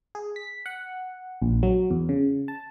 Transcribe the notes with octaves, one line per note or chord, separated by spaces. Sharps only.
G#4
B6
F#5
A#1
F#3
E2
C#3
A5